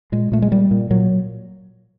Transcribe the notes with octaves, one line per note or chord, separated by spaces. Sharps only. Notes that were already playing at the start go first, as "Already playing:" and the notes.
A#2 G#3
A#2 A3
G#3
A#2 G3
A#2
A#2 F#3